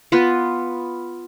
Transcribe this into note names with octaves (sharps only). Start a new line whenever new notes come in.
B3 F4 B4